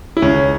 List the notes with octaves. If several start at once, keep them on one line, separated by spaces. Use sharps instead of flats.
E4
C#2 C#4